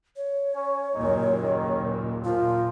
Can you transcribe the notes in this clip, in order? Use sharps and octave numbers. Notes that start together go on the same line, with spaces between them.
C#5
C#4
F#1 D#2 A#2 D#4
D#3
A#2 F3 F4